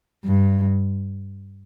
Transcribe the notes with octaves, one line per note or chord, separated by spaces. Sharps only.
G2